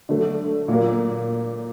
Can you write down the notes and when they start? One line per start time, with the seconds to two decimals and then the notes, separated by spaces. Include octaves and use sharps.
0.09 D3 F#3 A3
0.68 A#2 F#3 A#3